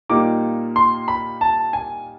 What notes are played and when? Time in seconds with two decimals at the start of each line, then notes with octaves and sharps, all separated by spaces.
0.09 A#2 G3 A#3 D#4 D6
0.76 C6
1.08 B5
1.41 A5
1.73 G#5